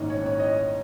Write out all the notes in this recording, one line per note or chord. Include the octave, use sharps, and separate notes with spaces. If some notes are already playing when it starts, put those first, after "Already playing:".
Already playing: A#1 G#2 D#3 A#3 C#4 D#5
C#5
C#5
D#5